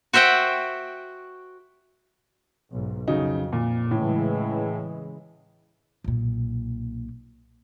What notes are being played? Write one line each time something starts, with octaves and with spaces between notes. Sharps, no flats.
F#4 C5 E5 F#5 G5
B1 G#2
F2 C#3 F#3 D#4
A#2
A2 C#3 E3 G#3
B1 A#2